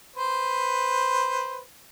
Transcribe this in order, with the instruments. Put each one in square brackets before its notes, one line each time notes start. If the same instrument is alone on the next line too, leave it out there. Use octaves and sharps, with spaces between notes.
[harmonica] B4 C5